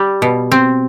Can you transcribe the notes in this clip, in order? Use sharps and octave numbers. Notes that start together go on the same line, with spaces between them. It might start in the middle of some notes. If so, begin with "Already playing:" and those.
Already playing: G3
B2
C4